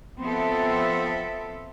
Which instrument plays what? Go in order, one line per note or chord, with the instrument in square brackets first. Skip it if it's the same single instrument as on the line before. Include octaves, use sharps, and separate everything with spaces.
[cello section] F3 B3 C4 A4 E5